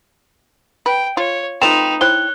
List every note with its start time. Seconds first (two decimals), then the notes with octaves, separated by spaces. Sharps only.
0.86 B4 G5
1.17 F4 C#5
1.62 A3 C4 D#4 F4 B4 G5 E7 F7
2.01 E4 C5 C#5 G5 F#6 G7